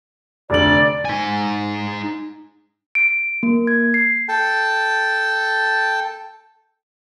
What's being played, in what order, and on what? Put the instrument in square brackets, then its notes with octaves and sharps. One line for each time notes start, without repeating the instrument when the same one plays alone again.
[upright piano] F1 D3 F#7 [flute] D5
[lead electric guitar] D#4 G#5
[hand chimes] D7
A#3
G#6
C7
[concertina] A4 G5 A5